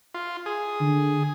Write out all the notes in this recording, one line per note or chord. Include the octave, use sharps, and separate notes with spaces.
F4
G#4
D3